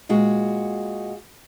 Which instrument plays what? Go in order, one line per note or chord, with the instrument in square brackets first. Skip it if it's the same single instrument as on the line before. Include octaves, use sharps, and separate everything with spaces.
[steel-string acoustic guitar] A#2 G#3 F#4